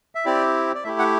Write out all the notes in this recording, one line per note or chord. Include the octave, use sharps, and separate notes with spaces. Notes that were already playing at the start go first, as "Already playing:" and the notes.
E5
C4 E4 G4 D5
D5
A3 E4 G4 E5
F#5